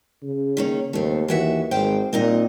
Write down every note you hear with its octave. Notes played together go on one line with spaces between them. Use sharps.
C#3
D#3 A#3 C#4
D#2 A3 C4
D#2 E3 F#4 E5
G#1 C5 F5 G5
A#2 C4 D#4 D#5